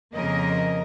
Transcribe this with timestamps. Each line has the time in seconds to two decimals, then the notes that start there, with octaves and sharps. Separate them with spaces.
0.13 F2 C#3 A#3 A#4 D#5